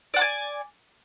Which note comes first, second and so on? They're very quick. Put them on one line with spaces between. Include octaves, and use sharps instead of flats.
D5 F#5 D6 G#5